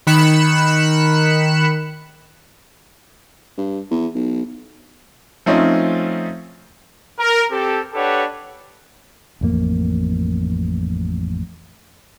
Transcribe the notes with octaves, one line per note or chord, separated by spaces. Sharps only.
D#3 B5 F#6 C#7 E7
G2
E2
B1
F3 A3 C4 C#4 D#4 F4
A#4
C4 G4 A4
D4 G4 A4 B4 C#5 F#5
A1 F2 A#3